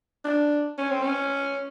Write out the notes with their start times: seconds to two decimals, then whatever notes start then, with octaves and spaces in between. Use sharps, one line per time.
0.24 D4
0.78 C#4
0.90 C4
1.02 C#4